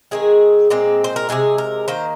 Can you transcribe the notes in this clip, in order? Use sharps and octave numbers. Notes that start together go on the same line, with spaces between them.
D#3 G#3 C4 G#4
A#2 G#3 C4
C5
A#4
C3 D#3 G#3 G#4
A#4
D#3 A#3 C5